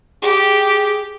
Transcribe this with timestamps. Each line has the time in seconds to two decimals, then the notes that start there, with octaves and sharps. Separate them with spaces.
0.22 G4 G#4